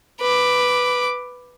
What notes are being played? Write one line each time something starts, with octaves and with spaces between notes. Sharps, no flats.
B4 D6